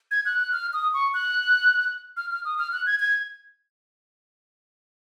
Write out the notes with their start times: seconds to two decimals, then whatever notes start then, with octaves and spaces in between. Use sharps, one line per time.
0.11 G#6
0.25 F#6
0.39 F#6
0.52 F6
0.73 D#6
0.94 C#6
1.14 F#6
2.17 F6
2.31 F6
2.45 D#6
2.59 F6
2.73 F#6
2.86 G#6
3.00 G#6